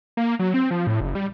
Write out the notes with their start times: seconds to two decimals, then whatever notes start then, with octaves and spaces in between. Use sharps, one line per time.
0.17 A#3
0.39 F#3
0.54 C4
0.71 F3
0.87 A2
1.01 F#1
1.15 G3